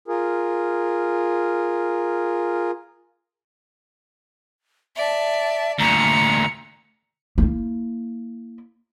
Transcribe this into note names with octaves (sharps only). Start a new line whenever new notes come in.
F4 G#4 A#4
D5 E5 A5
D2 A#2 A#5 C#7
A#3 E4